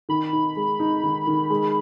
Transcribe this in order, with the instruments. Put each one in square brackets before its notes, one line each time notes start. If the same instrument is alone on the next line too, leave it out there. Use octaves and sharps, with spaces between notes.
[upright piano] D#3 [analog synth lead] B5
[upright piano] D#4
G#3
D#4
D#3
D#3
G#3